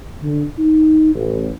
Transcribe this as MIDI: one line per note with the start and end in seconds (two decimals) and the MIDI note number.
0.22 0.44 50
0.58 1.11 63
1.15 1.49 33